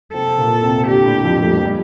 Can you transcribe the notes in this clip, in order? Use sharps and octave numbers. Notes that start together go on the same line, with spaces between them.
C3 C4 A4
A#2 A#3
C3 C4
D3 D4 G4
A2 A3
F2 F3
A3
G3
F3
G3